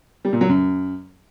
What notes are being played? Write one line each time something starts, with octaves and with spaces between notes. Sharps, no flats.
G3
A#2
F#3
F#2